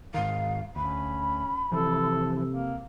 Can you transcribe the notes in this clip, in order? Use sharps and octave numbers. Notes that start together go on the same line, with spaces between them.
G#2 D#3 F5
D2 C#4 B5
C3 E3 F3 A4
A#3